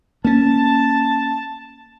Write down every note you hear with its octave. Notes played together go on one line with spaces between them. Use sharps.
A#3 C#4 A5